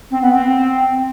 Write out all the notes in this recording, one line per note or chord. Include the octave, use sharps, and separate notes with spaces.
C4
B3
C4